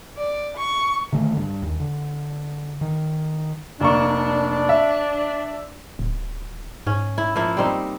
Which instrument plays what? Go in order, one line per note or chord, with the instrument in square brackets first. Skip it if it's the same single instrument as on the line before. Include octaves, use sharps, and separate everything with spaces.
[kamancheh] D5
C#6
[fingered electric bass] D3 D#3 A3
G2
D#2
D3
D#3
[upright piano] F1 A#3 C#6 [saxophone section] D4
[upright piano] E5
[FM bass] D1
[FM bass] G#2 [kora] C#4
[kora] E4
F3 A#3 E4
G3 C4 D#4